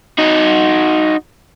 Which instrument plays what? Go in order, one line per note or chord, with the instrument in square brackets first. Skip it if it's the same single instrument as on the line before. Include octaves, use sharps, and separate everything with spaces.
[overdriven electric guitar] D#4 F#4